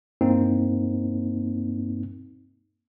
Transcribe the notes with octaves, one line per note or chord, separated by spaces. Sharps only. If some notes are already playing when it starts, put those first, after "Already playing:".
G2 A#3 C4 D#4